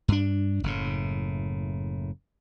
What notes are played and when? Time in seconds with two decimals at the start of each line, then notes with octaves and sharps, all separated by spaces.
0.08 G2 D4
0.63 F#1 A2